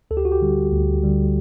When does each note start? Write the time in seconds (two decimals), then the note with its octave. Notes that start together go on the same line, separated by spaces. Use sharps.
0.11 D2 A4
0.17 G4
0.25 F#4
0.32 G4
0.42 D3 G3
0.72 D2
1.04 D3 G3